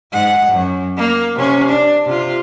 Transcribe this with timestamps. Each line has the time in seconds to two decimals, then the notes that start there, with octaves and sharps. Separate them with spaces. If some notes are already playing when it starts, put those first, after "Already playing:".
0.13 G#2 F#5
0.51 F#2
0.97 A#3
1.35 C3 C#4
1.69 D4
2.05 C3 F4